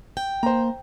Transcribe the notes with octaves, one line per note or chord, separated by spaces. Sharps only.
G5
A#3 C5 A#5